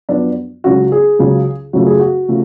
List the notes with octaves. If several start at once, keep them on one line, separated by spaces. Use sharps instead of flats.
F#2 F3 B3 D4
C#2 C#3 F#3 C#4 F#4
G#4
C#2 C#3 F#3 C#4
F#2 C#3 F3 A3 F#4
G#4
F#4
C#3 F3 A3